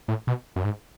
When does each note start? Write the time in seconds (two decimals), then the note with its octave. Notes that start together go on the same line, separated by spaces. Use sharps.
0.08 A2
0.27 B2
0.56 F#2
0.64 G#2